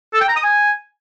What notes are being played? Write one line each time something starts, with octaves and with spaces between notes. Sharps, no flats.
A4
G5
A#5
D#6
G#5